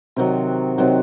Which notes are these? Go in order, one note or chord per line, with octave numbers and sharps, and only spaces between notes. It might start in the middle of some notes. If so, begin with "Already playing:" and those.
C3 D#3 F#3
C3 D#3 F#3